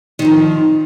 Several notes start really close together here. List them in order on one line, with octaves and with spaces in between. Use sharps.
D#3 C4 F3